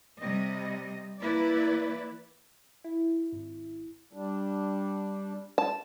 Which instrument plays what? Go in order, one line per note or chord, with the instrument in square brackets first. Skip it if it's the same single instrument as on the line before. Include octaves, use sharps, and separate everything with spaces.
[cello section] C3 G3 D#5
E3 A#3 E4 B4 D5
[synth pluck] E4
G#1
[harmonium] G3 D4
[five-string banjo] A5